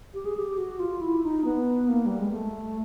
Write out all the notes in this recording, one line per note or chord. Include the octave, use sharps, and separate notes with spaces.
G4
G#4
G4
F#4
F4
E4
D#4
B3
A#3
G3
G#3
A3